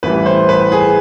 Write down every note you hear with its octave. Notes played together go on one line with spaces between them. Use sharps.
A1 A2 E3 G3 B4
C5
B4
G#4